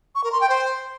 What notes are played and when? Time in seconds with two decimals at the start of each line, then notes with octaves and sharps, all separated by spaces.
0.15 C#6
0.24 A#4
0.32 C6
0.41 G5
0.49 C5